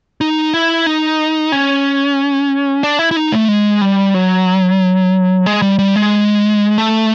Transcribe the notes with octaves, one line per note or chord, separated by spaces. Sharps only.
D#4
E4
D#4
C#4
D4
E4
E4
D#4
A3
G#3
G3
F#3
G#3
G3
G3
G#3
A3